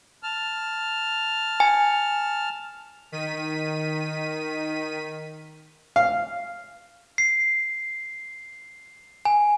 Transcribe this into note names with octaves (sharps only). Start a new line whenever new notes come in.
A5 F6
G#5
D#3 B6 D#7
F5
C7
G#5